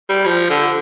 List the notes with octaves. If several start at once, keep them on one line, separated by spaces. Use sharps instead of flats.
G3
F3
D3